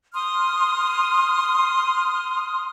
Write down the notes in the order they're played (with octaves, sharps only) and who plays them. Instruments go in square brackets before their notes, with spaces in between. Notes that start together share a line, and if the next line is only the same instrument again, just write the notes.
[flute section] C6 D#6 F6